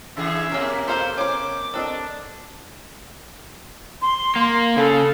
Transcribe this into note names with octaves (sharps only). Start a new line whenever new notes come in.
C#3 E3 G#4 E5
B2 A#3 C#4 A#4
A4 C5 F5 A#5
C#4 C5 D6
C4 D4 A4 D#5
C6
A#3
C#3 A4